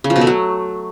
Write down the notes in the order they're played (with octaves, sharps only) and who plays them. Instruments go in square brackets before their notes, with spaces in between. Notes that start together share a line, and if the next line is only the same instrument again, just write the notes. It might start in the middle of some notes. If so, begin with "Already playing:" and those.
[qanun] C#3
F3
B2
A3
F#3